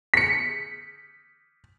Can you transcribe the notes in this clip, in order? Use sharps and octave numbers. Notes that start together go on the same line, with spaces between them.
B6 C#7